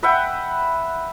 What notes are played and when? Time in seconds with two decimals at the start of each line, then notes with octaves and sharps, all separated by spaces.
0.03 B4 E5 F#5 G5